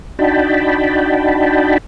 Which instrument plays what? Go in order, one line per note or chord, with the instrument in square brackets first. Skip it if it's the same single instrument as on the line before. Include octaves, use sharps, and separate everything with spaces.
[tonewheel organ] D4 D#4 F#4 G5 A5 B5